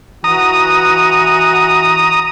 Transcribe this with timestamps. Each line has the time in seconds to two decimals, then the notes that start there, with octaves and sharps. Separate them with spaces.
0.24 E3 F#4 A#5 D#6